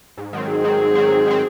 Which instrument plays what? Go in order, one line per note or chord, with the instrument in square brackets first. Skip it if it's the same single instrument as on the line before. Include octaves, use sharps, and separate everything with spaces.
[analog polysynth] G#2
D#3 F#3 C4
[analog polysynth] G#2 [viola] G#4
[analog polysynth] D#3 F#3 C4
G#2
D#3 F#3 C4
G#2
D#3 F#3 C4